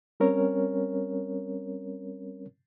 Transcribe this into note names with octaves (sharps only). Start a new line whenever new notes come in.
G3 C4 C#4 A#4 C#5